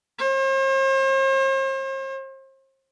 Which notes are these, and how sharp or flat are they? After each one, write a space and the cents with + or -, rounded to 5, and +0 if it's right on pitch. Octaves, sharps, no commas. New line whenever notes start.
C5 +45